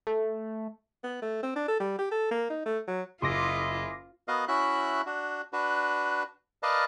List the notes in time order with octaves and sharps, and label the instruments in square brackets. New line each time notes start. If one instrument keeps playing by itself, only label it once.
[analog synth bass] A3
[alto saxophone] B3
A3
C4
D4
A4
G3
G4
A4
A#3
D#4
A3
F#3
[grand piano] F#1 [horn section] E4 G#4 D#5 [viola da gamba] F4 [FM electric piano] C6 D6 A#6
[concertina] B3 F#4 A#4 D#5 F5
C#4 E4 F#4 E5 F#6
D4 F#4
D4 F#4 B4
A#4 B4 D5 D#5 F5 A5